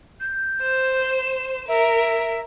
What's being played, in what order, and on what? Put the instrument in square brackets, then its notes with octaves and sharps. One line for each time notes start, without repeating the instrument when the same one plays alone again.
[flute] G6
[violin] C5 E7
[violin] A#4 [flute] E5